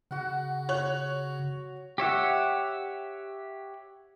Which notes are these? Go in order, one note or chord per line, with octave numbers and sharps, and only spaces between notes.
C#3 F#4 F#5
C#5 F#6
G4 C#5 E5 F#5